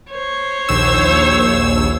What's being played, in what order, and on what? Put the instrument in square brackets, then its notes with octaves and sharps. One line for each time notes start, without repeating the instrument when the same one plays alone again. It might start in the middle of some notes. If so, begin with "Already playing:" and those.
[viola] C5 C#5
[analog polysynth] A#1 D#2 E6